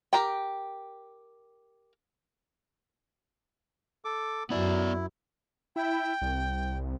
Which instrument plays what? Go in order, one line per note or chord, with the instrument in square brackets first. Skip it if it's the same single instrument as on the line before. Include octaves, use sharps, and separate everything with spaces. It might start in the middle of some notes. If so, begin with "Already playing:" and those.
[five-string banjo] G4 A#4 G5
[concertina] A4 D6
[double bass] F#2 [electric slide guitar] B3 D5 [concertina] E4
[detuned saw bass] E4 [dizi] G5
[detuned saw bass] C2